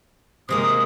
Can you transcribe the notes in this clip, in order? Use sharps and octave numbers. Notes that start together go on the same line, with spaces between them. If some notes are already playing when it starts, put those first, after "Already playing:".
C3 G#3 A#3 D#6